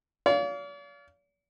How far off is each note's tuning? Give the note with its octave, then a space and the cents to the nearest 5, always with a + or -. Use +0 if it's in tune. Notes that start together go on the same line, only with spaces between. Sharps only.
D5 -45 F5 +0